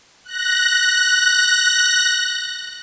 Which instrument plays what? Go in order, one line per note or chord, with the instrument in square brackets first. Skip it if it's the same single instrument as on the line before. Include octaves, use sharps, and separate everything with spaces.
[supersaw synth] F#6 A#6